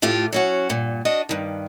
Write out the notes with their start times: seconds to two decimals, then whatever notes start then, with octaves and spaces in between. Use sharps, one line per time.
0.02 A2 A3 F4 G4
0.33 F#3 C#4 F#4
0.69 G2 A#2
1.05 D4 F#4 D#5
1.29 G2 D#3